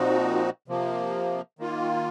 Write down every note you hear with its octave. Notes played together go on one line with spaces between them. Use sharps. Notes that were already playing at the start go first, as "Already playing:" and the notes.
Already playing: A#2 F3 C4 D#4 F#4
C3 F3 A#3
D#3 A#3 F4